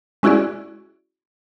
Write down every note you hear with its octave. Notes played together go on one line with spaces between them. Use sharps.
G#3 C#4 E4 F#4 G#4 D5